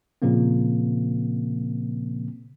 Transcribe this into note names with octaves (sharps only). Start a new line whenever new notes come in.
A#2 C#3 F3 A#3 C4